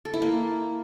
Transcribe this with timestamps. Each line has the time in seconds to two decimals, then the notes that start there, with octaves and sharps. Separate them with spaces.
0.05 A4
0.14 E4
0.22 A#3